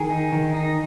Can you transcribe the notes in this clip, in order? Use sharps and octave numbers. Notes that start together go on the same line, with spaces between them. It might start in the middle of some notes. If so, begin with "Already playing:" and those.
Already playing: D#3 G#4
D#4
D#3
D#4